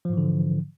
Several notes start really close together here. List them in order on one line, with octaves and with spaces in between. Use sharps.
F3 G#2 E3 D3